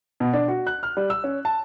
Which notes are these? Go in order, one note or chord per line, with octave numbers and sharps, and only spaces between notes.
B2
D4
F#4
F#6
F6
G3
E6
C#4
A5